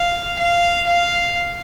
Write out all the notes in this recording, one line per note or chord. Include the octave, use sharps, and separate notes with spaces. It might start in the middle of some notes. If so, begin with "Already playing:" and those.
Already playing: F5
F5
F5